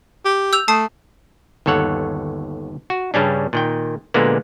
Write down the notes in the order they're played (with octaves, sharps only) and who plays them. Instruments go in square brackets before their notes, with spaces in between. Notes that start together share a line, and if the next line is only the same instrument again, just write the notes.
[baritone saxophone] G4
[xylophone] E6 G6 F7
[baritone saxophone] A3 [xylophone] A5 D#6 C7
[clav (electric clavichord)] G1 D#2 A4 C#5 F#5
F#4
G2 C#3 G3 C#4 D4
A#2 D#3 G5
A#2 D3 G#3 A#3 B3